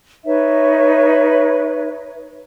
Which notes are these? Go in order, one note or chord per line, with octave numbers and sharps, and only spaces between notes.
D#4 B4 C#5 E5